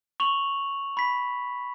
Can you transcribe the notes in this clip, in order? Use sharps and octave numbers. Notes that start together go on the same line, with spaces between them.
C#6 F7 F#7
B5 B6